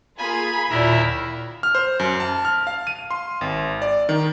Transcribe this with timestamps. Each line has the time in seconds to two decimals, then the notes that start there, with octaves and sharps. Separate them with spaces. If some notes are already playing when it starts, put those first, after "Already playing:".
0.18 A#3 F4 G#4 G#5 B5
0.70 D#2 A#2 E4 A#4 E5
1.63 F6
1.75 C5
2.00 F#2
2.20 A5
2.45 F6
2.67 F5
2.87 D#7
3.11 C6
3.41 G#1
3.82 D5
4.09 D#3